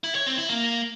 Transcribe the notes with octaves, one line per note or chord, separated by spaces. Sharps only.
E4
C#5
C4
E4
A#3